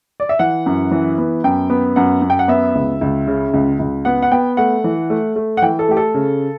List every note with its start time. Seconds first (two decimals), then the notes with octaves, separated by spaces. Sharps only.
0.20 D5
0.29 E5
0.39 E3 F#5
0.66 F#2
0.91 E3
1.18 B3
1.44 F#2 G5
1.70 B3
1.96 F#2 F#5
2.22 F#2
2.30 G5
2.39 F#5
2.48 B3 E5
2.75 C#2
3.01 C#2
3.27 C#3
3.54 C#2
3.79 C#2
4.05 B3 F#5
4.22 F#5
4.31 B3 G5
4.57 A3 F#5
4.84 E3
5.10 A3
5.36 A3
5.57 F#5
5.62 E3 G5
5.79 A4
5.88 A3 G4
5.97 A4
6.14 C#3